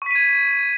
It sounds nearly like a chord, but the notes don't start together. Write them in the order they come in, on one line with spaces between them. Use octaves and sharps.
C#6 B6 D#7 G#6